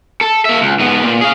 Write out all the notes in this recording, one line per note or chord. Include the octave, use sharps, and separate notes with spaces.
A4
A#3 E5
C#2
G#2 B3
A#2
G#4 F5